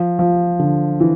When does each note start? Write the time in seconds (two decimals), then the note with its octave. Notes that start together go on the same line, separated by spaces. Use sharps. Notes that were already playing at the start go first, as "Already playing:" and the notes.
Already playing: F3
0.19 F3
0.59 D3
1.00 E3